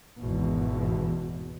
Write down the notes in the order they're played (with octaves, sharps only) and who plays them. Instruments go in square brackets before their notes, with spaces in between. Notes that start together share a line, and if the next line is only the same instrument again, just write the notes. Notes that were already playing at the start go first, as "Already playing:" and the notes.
[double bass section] G#1 E2 G#2 B2